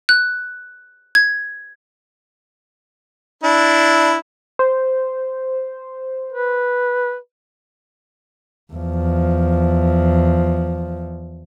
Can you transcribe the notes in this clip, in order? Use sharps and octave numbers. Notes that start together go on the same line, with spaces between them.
F#6
G#6
D4 E4
C5
B4
E2 F3